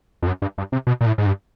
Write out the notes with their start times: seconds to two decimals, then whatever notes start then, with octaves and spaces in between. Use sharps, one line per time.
0.22 F2
0.27 F#2
0.42 G2
0.58 G2
0.72 C3
0.87 B2
1.01 A#2
1.06 A2
1.18 G#2
1.26 G2